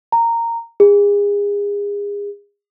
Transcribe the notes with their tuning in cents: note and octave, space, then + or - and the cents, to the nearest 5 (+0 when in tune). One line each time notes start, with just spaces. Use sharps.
A#5 -10
G#4 -35